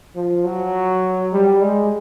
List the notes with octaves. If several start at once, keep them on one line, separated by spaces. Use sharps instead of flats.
F3
F#3
G3
G#3